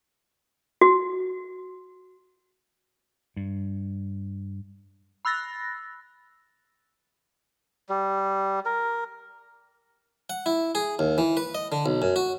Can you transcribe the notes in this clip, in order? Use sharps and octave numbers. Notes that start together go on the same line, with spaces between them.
F#4
G2
B5 E6 F#6 A6 A#6
G3
A#4
F#5
E4
G#4
D#2
E3
B4
D#5
D3
B1
F#2
F#4